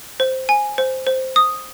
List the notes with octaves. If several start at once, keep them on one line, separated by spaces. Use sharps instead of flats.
C5
G#5
C5
C5
D#6